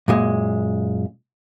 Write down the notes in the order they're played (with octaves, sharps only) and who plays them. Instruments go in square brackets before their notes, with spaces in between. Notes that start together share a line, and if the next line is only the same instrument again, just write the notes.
[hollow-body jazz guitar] F#2 A#2 G#3